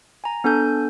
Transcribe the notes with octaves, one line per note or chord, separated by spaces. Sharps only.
G#5 A#5
B3 D4 A4 G#5 G6